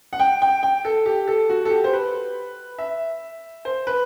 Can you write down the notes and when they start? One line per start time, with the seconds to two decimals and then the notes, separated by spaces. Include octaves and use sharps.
0.13 F#5
0.20 G5
0.42 G5
0.63 G5
0.85 A4
1.06 G4
1.28 A4
1.50 F#4
1.65 A4
1.70 G4
1.84 C5
1.93 B4
2.78 E5
3.65 C5
3.87 B4